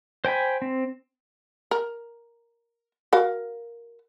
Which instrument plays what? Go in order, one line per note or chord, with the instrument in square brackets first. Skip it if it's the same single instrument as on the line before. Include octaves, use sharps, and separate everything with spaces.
[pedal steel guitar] C5 G5 G#5 B5
C4
[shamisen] A#4
F#4 A#4 F5